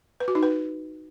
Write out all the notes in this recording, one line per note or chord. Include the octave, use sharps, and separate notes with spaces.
B4
F#4
D#4
B4